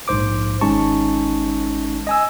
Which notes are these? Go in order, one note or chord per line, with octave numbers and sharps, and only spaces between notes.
A#1 G#2 C5 D6
G#1 G#3 C#4 D#4 A5 C#6
D#5 G#5 E6